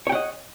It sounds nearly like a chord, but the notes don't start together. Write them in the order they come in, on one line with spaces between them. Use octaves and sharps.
C#5 G5 F#5 D#5